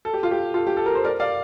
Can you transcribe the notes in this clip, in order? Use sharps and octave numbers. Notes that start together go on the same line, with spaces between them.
A4
G4
F4
G4
F4 A4
G4
A4
A#4
C5
A#4 D5
D5 F5